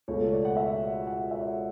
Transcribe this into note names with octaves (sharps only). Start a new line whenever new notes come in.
C#2 B2 A3 C#5
D5
F#5
E5
F#5
E5